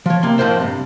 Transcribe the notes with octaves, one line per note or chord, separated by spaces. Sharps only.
F3 C#5
C3 A#3 C6
F2 A2 A#4 C5 E5
G2 C3